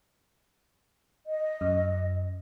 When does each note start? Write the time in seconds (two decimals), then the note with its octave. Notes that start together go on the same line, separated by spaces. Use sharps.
1.27 D#5
1.61 F#2